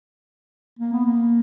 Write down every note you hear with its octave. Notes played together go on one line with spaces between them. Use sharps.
A#3
B3
A#3